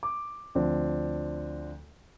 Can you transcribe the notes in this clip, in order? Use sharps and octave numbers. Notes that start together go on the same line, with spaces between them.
D6
D2 F3 C4 D4